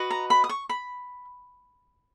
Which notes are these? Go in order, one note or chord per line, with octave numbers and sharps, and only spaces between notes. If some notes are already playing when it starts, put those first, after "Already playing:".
Already playing: F#4 B4 D#5
A#5
B5
D#6
C#6
B5